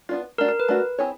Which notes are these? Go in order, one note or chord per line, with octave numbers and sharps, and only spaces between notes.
B3 D4 F4
A3 D4 F#4 A#4
A#4
B4
A3 D4 F#4
C4 E4 G#4 C#5